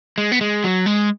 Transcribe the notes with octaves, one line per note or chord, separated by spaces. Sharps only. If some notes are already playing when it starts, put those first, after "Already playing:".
G#3
B3
G#3
F#3
G#3